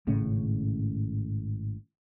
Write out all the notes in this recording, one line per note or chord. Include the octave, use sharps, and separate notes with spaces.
G#1 A2 C#3 C#4